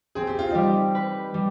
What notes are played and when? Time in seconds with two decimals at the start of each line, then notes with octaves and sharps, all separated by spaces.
0.15 C4 G#4
0.27 G4
0.39 F4
0.51 G3 D#4 G4
0.95 B4
1.34 G3